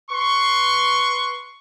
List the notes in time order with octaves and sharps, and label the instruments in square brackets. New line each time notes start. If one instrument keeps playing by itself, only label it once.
[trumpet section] B4 C6 C#6